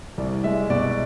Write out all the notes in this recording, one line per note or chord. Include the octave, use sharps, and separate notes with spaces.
C2 D5
G#3 E5
B2 D5